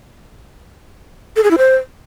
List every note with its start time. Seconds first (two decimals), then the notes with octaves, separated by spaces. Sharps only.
1.36 A4
1.44 G#4
1.51 E4
1.58 C5